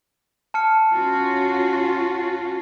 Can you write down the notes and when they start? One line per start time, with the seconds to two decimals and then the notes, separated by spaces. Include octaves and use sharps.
0.54 A5 F6 C#7
0.93 C#4 F4 F#4